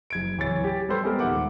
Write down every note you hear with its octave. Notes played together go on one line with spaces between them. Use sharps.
F#1 G#6 D7
D1 E3 C#5 A6
G4
G3 G4 A4 B4 C5
G#3 B3 G4 A4 A#4
D#1 D#3 E5 F#5 D6